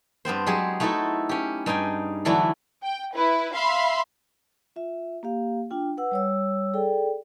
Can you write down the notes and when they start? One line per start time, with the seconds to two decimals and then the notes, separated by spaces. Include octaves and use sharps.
0.25 G2 B3 C4 C5
0.46 F#3 G#3 G4 G#4
0.80 A3 D#4 E4 F#4 A4 E5
1.29 C#4 G4
1.66 G2 D#4 G#4 G5 G#5
2.25 D3 E3 F#3 A3 D4 E4
2.83 G5
3.15 E4 B4
3.54 E5 F5 B5 C6
4.76 F4 E5
5.23 A#3 G4 F5
5.71 D4 F4 G5
5.98 B4 F#5 E6
6.11 G3 C#5 E6
6.74 G#4 A4 D5 G5